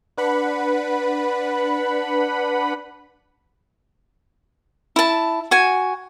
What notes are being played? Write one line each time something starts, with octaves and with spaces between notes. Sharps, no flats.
D4 B4 F#5 B5
E4 A5
F#4 G#5